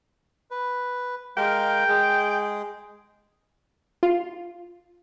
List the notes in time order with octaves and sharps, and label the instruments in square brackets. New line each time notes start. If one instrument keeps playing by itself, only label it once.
[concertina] B4
[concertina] G#3 A#4 F5 [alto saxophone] G5
[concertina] G#3 G#4
[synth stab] F4